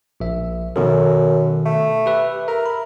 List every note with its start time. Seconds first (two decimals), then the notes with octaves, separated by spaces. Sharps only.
0.20 A#1 E5
0.76 F#2 B2 D#3 A4
1.66 A3
2.06 G4 B4 E5
2.48 A#4 E5
2.66 B5